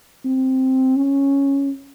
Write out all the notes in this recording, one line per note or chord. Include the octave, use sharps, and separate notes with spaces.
C4
C#4